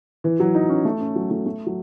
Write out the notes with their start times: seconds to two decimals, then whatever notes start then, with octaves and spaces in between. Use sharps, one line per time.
0.24 E3
0.40 F#3
0.55 D#4
0.69 C#4
0.85 A3
1.00 C#4
1.16 F#3
1.31 A3
1.46 A3
1.66 F#3